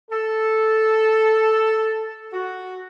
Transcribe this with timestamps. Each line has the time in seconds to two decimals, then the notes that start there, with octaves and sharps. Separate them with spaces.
0.11 A4
2.33 F#4